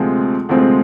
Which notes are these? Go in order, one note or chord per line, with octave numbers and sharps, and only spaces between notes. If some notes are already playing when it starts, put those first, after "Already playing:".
Already playing: D2 C3 F3 G#3 C4
D2 C3 F3 G#3 C4